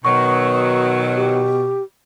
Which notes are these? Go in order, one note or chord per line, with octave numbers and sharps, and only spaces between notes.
B2 D#3 F#3 C#6
G4